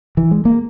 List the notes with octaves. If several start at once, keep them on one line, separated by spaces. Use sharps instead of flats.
E3
G#3
A#3